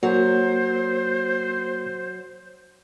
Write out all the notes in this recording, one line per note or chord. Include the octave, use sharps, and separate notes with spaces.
F#3 A#3 F#4 A#4 C5